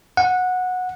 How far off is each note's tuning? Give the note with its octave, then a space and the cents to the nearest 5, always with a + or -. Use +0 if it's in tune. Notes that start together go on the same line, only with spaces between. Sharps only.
F#5 -15